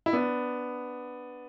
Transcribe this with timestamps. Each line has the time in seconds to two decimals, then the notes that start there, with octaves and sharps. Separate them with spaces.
0.06 E4
0.13 B3 D4